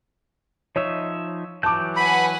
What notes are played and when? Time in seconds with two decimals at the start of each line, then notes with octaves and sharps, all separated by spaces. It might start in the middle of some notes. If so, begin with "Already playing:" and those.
0.76 F3 D#4 C#5 E5
1.63 E3 F#3 A5 D6 G6
1.97 B4 F#5 G#5 B5